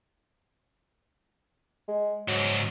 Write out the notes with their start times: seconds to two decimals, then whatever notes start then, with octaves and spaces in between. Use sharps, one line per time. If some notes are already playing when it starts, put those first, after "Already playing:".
1.88 G#3
2.28 C#2 G#2 F#3